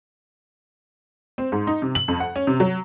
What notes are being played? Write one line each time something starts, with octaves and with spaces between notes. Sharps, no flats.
C4
G#2
D#4
C3
F#7
F2
F#5
C#4
C3
F#3